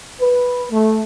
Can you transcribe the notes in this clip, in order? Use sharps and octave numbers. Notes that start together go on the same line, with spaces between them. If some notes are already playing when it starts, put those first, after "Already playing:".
B4
A3